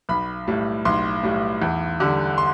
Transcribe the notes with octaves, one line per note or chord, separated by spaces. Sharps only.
B1 B5
A2 G3
B1 C6
A2 G3
E2
D3 G3
C6